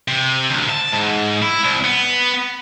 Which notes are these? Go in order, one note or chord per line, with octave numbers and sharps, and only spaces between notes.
C3
D2
A5
G#2
E4
C2
B3